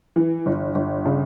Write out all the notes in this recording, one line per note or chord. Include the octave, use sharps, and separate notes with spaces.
E3
G1
G1
C#3